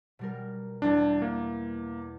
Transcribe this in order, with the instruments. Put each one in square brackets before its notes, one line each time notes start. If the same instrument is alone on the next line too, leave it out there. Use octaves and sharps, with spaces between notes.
[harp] B2 G3 A#4
[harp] E2 G3 B3 [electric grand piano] D4
[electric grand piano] A#3